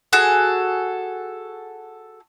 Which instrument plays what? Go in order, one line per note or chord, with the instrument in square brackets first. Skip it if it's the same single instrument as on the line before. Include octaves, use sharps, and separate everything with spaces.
[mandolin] F#4 G#4 A4